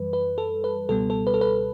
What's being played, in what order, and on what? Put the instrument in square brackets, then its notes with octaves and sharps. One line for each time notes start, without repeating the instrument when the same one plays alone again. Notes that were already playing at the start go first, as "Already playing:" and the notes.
Already playing: [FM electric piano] F#2 E3 G3 B4
B4
A4
B4
C#2 B2 G3 B3 A4
A4
B4
A4
B4